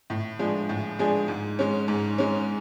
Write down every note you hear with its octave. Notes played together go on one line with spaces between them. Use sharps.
A2
F3 G#3 D4 G#4
A2
F3 G#3 D4 G#4
G#2
G#3 C#4
G#2
G#3 C#4